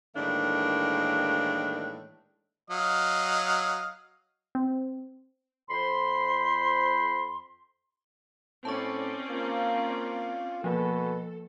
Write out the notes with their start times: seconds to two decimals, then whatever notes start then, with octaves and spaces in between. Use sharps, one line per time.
0.15 A2 D#3 E3 G#3 A#3 D4
2.70 F#3 D#5 F5
4.55 C4
5.70 F2 C5 B5 C6
8.65 A2 C4 C#4 D5 A5 C#6
9.29 A#3 F4
10.64 B2 F3 A#3 A4